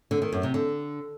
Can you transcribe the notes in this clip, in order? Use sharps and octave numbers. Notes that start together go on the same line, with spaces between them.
D3
D#3
F#2
C3
D3